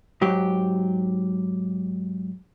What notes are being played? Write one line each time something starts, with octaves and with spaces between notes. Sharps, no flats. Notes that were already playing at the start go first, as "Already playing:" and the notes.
G#2 F#3 G4